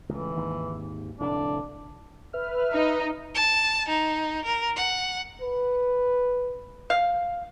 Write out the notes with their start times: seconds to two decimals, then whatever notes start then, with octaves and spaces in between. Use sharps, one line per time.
0.09 C#2 A2 E3
0.36 G#1 D#2 G#2
1.20 F1 A2 D3 D4
2.33 B4 E5 F6
2.72 D#4
3.35 A5
3.89 D#4
4.45 A#4
4.76 F#5
5.41 B4
6.90 F5